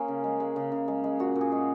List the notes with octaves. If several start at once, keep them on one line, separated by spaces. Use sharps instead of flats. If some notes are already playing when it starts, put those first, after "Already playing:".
Already playing: A#3 C#4 G#4
C#3
G#3
G#3
C#3
C#3
G#3
G#3
A#2 F#4
A#2
G#4
G#3